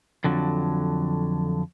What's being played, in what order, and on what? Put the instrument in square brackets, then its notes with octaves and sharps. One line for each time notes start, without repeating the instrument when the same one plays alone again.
[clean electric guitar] F2 D3 F#3